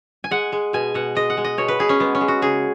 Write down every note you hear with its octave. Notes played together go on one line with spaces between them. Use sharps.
G#5
G#3 F#5
G#3
B2 G#5
B2 F#5
G#3 D#5
F#5
G#3
D#5
B2 C#5
B4
B2 G#4
C#4
G#3 B3
C#4
G#3
F#4
C#3 G#4